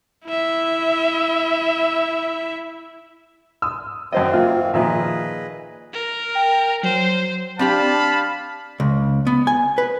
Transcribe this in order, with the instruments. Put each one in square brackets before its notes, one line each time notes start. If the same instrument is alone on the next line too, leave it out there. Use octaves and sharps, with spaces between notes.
[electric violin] E4 E5
[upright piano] D#6 E6
[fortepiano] F#2 C5 D#5 [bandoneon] D#3 E3 C4
[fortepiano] A#3 [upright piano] F4
[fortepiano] A#2 D#3 F3 [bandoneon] G#4 B4 D#5 [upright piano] E5
[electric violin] A#4
[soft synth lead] G5
[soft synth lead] F#3 [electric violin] C5
[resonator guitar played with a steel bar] C4 D4 G4 [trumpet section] F5 A5 B5
[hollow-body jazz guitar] C#2
B3
G#5
B4